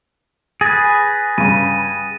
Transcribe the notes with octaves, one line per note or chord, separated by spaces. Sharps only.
G#4 B4 A6 A#6
G2 C#3 D#7